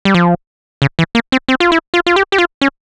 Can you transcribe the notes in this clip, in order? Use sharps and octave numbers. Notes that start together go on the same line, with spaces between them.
G3
F3
C#3
E3
A#3
C4
C4
F4
E4
F4
F4
G4
G4
F4
C#4